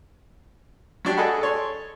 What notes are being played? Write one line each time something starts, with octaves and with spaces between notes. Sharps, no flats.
F#3 D4 G4
G#4 A4 D#5 F#5 B5
A4 C#5 C6